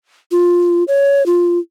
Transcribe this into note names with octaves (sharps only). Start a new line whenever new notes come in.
F4
C#5
F4